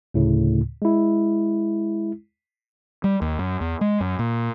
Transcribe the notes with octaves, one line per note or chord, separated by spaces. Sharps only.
D2 A2 C#3
G#3 E4
G3
D#2
F#2
E2
G#3
F#2
A#2